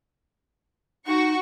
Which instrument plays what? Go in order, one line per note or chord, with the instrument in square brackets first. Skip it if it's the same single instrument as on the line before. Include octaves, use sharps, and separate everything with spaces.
[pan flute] D#4 [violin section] F#4 C#6